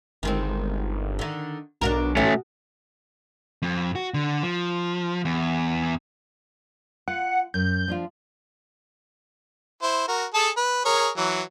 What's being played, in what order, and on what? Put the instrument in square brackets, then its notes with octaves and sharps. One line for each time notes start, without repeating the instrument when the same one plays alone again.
[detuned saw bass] G1 [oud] D#3 G#3 C4
[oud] D3 D#3
[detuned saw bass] B1 [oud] D4 F#4 A#4
[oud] B2 F#4 [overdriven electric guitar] A3 C#4
[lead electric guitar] F2
F#4
D3
F3
E2
[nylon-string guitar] F4 [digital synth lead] F#5
[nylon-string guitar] F#2 [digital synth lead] G6
[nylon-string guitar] F3 D4 F4
[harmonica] E4 C5
F#4 A#4
G#4 A4 A5
B4
G#4 A#4 C#5
E3 F#3